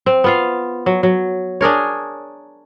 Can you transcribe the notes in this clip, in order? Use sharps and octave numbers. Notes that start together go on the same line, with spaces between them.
C4
B3 F4 F5
F#3
F#3
D4 G#4 A#4 C#5